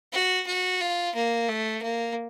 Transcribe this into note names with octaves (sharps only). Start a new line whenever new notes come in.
F#4
F#4
F4
A#3
A3
A#3